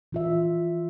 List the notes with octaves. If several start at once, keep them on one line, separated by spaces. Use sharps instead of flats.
E3 F4 E5